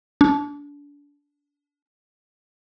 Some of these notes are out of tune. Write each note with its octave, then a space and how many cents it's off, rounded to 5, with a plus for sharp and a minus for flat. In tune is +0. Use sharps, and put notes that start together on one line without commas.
D4 -30